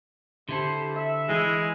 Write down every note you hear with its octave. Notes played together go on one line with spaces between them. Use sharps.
D3 E4 G4 A4 C5
E5
E3 G#3 E4